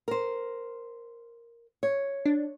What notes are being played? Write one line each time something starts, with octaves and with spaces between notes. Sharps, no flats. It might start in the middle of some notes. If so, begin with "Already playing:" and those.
A#4 C5
C#5
D4